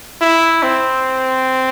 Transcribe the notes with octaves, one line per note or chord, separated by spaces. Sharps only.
E4
C4